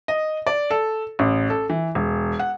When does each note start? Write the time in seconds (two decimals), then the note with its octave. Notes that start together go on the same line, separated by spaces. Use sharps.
0.08 D#5
0.47 D5
0.71 A4
1.19 A1
1.50 A4
1.70 E3
1.95 E1
2.39 F#5